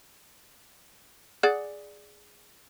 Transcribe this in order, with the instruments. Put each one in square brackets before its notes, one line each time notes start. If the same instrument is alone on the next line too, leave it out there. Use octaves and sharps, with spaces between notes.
[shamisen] G#4 D5 F#5